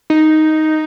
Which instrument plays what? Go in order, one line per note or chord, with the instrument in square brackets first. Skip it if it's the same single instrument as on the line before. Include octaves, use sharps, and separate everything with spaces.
[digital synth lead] D#4